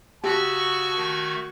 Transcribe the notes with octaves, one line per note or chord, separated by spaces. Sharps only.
C#3 F#4 G4 A5 C#6 E6
D#3 A3 G#6